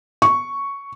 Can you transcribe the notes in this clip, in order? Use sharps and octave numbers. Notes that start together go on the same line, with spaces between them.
C#6